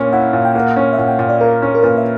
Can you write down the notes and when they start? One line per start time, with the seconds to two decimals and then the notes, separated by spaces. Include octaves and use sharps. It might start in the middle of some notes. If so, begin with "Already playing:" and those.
Already playing: A#2 A#3 C#4
0.13 E4 F#5
0.33 A#2
0.45 G5
0.55 A#3 F#5
0.76 C#4
0.93 E5
0.98 A#2 F#5
1.08 G5
1.19 A#2
1.29 D5
1.41 A#3 A#4
1.62 C#4
1.75 A#4
1.83 A#2 B4
1.97 E5